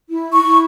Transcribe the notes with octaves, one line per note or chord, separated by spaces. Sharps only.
E4
C#6
E4